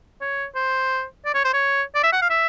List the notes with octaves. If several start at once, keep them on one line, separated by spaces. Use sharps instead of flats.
C#5
C5
D5
C#5
C5
C#5
D5
E5
F#5
F5
E5